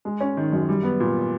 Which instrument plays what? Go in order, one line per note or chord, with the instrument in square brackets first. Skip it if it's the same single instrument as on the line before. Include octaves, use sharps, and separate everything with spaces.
[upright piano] G#3
C#4
D#3
F#2
G3
B3
A#2